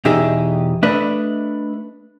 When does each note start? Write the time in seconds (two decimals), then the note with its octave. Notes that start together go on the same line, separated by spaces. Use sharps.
0.05 E2 B2 D#4 G4 G#4 E5
0.83 A3 D4 B4 D#5 E5